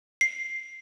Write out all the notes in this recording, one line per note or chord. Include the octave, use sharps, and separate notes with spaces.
C7